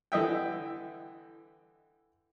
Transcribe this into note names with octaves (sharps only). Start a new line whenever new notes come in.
D3 E3 D#5 E5 G5